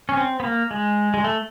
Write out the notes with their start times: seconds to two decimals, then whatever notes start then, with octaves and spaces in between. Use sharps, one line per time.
0.09 C#4
0.17 C4
0.40 B3
0.43 A#3
0.71 G#3
1.14 G#3
1.24 A3